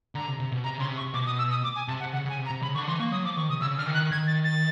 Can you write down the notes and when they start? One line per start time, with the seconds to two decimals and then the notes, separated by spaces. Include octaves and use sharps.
0.15 D3 A#5
0.27 C3
0.39 C3
0.52 B2
0.64 C3 A#5
0.77 C#3 C6
0.88 C3
0.97 C#6
1.01 C3
1.14 B2 D6
1.26 D#6
1.38 E6
1.51 D#6
1.64 D6
1.76 G#5
1.88 C3 A5
2.00 F#5
2.03 C3
2.13 C#3 F#5
2.25 C#3 G#5
2.38 C3
2.46 A#5
2.50 C3
2.62 C#3 B5
2.75 D3 C#6
2.87 E3 C6
2.99 A#3 C#6
3.12 F#3 D#6
3.25 F3 D6
3.36 D#3 C#6
3.49 C3 D#6
3.61 C#3 E6
3.77 D3 F6
3.86 D#3
3.94 F#6
4.11 D#3 G#6
4.27 A6
4.44 A6